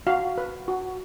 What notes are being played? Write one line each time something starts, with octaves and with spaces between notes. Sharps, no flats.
F#4 F5
B4
F#4